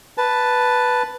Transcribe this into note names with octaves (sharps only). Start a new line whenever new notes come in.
B4 A5